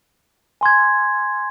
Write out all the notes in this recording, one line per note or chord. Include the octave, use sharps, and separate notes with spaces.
G#5 C6 G#6